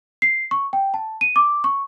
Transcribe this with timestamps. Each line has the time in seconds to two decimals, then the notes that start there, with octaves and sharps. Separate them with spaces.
0.22 C7
0.51 C#6
0.73 G5
0.94 A5
1.21 D#7
1.36 D6
1.64 C#6